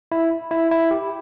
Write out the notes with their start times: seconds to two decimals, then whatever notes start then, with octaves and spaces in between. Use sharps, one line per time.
0.12 E4
0.51 E4
0.71 E4
0.91 G4